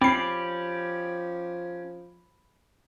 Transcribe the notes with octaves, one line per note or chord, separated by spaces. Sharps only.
F3 C4 C#4 G4 D5 B5 C7